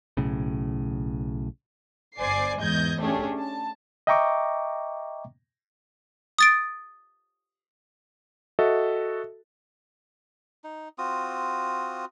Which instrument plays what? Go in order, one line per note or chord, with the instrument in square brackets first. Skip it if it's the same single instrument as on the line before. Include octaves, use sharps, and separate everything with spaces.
[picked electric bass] B1 A2 C#3
[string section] G1 C5 D5 G#5 C7
E2 G#2 D#5 G6 G#6
A3 C#4 D4 G4 G#4
A5
[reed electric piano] D#5 E5 G5 A#5 C#6 D6
[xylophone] D#6 A6 D7
[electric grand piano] F#4 A4 D#5 E5
[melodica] D#4
C4 F4 F#4 D#6